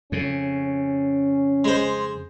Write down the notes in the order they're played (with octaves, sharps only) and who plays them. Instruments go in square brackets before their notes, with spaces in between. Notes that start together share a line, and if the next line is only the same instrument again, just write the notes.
[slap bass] F2 C#3 [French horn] C#4
[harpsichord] G#3 C5